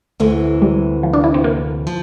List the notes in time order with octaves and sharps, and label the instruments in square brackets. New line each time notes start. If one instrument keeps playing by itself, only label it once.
[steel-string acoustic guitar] D2 C3 E3 [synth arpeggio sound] A3
[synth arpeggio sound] G3
F3
D4
E4
C4
A#3
[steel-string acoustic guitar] F3